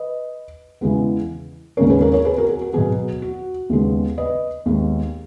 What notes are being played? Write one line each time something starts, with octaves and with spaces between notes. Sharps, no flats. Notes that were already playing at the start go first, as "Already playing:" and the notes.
Already playing: B4 D#5
E2 C#3 E3 G#3 B3
D#2 C#3 G#3 C#4 A#4 C#5
G#4 B4
A#4 C#5
A#4 C#5
G#4 B4
F#4 A#4
G#4
F#4
B2 F#3 B3 G#4
F#4
D#2 C#3 G#3 B3
B4 D#5
D#2 D#3 G#3 B3